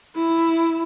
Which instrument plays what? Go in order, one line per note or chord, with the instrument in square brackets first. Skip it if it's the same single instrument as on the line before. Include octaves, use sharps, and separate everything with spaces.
[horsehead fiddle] E4